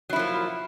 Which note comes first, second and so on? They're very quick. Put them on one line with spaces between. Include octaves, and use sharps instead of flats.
F#3 E4 F3 A#3